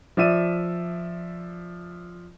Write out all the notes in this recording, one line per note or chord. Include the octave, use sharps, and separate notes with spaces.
F3 D5 E5 D#7